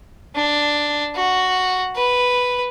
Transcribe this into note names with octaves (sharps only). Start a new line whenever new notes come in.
D4
F#4
B4